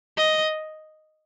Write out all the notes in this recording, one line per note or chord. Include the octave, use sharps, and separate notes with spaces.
D#5